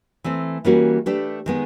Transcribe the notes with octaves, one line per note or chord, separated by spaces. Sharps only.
E3 A3 C4
E3 G3 A#3 C#4 F#4
A3 D4 G4 B4
D#3 G#3 B3